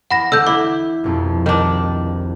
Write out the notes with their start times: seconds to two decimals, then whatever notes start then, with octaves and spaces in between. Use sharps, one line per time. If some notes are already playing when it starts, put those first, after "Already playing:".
0.10 E2 F#5 B5 A#6
0.32 D3 B3 E6 G6 A#6
0.47 E4 D6
1.04 E1 C2 F2
1.46 D#3 D4